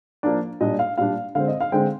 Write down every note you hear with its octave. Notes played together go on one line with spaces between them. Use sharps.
F3 A#3 D4 D5
A#2 G3 D4 D#5
F5
A#2 G3 D4 F5
D3 G#3 C4 F5
D#5
F5
D3 G#3 C4 G5